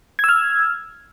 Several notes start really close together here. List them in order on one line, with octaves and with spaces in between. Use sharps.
G#6 E6 F6